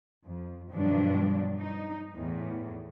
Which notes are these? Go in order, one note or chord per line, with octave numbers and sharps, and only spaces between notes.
F2
G2 B2 D#3 F3 F#3 D4
D#4
E2 A2 E3